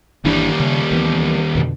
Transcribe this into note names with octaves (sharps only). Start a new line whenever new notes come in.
G1 D#2 E3 G3 D4
C#3
D2 E3 B3
F2 B2 D3